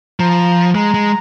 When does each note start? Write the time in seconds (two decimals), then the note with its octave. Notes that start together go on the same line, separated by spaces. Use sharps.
0.20 F3 A#5
0.75 G#3 A#5
0.94 G#3